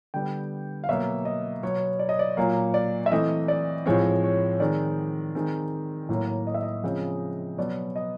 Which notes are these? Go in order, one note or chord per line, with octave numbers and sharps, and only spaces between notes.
D3 G3 B3 G5
F5
B2 F#3 A#3 E5
D#5
B2 F#3 B3 C#5
D5
D#5
D5
A#2 F#3 A#3
D5
E5
E3 A3 C4 D#5
D5
A2 F3 G#3 C4 C#5
C#5
D#3 G#3 C4 D5
D#3 G#3 C4
A2 F#3 A#3
D#5
E5
D#5
C#3 F3 G#3 C4
B2 F#3 B3 D5
D#5